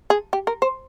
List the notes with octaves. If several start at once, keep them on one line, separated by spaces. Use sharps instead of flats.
G#4
G4
A#4
C5